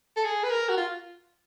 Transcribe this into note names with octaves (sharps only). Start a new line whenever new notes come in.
A4
G#4
B4
A#4
F#4
F4